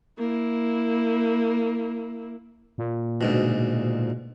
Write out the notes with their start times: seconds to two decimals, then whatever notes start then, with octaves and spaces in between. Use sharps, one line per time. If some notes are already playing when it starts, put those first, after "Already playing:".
0.18 A#3 E4
2.78 A#2
3.21 D2 G#2 B2